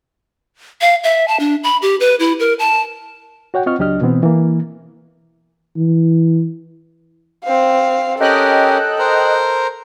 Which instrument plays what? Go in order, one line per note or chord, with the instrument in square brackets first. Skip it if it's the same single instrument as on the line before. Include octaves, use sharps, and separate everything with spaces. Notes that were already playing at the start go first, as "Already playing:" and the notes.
[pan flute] F5
E5
A5
D4
B5
G4
B4
E4
A#4
A5
[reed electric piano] F#4 C#5 F#5 G5
C4 F4 D#5 C#6 F6
C#2 F#3 D4 G4 D#5 F6
B2 E3 B3 C4
E3 A#3
[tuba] E3
[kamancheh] C4 F5
[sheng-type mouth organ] C#4 G4 A#4 [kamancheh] A4 [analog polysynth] D#5 G5 F#6
[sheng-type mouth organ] A#4 C5 A#5